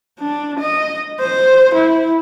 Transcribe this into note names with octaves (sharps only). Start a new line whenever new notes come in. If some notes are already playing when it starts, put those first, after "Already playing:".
D4
D#5
C5
E4